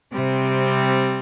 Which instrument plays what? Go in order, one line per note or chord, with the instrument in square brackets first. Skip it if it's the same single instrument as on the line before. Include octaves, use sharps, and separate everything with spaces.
[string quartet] C3 G3 C4